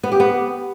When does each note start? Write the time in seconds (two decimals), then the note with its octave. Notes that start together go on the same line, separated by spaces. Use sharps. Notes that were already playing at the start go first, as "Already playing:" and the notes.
0.03 B3
0.12 G4
0.20 B3